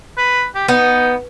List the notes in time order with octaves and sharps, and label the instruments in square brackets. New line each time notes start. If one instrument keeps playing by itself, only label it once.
[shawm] B4
G4
[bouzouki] B3 [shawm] D#4